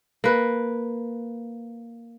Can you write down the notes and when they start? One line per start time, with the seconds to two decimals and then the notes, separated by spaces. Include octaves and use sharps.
0.24 A#3 B4